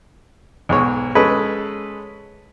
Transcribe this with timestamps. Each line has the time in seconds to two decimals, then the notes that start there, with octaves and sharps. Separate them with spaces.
0.69 B1 G#2 C#5
1.15 G#3 C#4 G#4 A4 B4